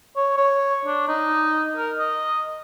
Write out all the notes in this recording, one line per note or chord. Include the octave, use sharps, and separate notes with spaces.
C#5
C#5
D4
D#4
A#4
D#5